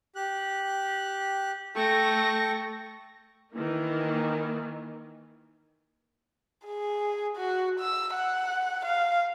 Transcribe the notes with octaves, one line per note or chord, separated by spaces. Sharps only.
G4 F#6
A3 A4 G5 C#6 A#6
D#3 E3 A#3
G#4
F#4
E6
F#5
F5